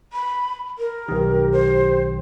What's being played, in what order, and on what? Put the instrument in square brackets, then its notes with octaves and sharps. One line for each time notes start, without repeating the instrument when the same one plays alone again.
[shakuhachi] B5
A#4
[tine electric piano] B1 D#3 [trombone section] G4
[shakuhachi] C5